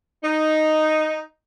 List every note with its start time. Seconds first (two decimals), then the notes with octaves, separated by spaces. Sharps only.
0.23 D#4